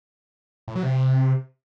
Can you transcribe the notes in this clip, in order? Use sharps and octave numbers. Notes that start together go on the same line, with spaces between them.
A2
F#3
C3